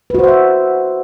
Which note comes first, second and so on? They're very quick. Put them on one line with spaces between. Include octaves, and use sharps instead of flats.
B4 F#4 C5 F#5 E5